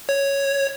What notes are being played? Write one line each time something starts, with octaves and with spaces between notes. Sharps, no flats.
C#5